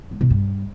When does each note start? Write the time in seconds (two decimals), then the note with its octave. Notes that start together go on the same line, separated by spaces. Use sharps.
0.11 G#3
0.21 B2
0.30 G2